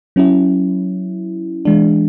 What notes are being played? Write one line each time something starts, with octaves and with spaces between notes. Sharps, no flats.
F#3 C#4 E4
E3 G#3 D4